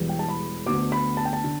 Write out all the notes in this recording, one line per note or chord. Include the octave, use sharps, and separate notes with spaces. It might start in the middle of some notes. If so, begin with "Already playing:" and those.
Already playing: E1 E2 E3 G3
G5
A5
B5
D2 D3 B3 D6
B5
A5
G5
A5
D3